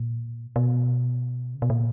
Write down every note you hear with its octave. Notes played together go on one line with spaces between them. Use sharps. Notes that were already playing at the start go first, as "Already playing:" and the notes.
Already playing: A#2
B2
C#3
B2
A#2